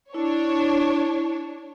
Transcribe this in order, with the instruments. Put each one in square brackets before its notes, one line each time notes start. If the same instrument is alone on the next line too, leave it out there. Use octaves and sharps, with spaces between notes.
[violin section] D4 C#5 [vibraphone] E4